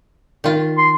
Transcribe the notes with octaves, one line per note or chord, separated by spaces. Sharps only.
D#3 F4
C6